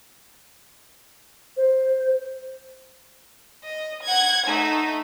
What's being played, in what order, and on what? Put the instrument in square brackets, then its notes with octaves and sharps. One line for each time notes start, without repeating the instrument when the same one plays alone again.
[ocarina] C5
[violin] D#5
F#5 G#6
A3 D#4